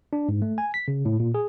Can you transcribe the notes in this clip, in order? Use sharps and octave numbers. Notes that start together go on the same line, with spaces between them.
D4
G#2
A3
G#5
B6
C#3
A2
A#2
G#4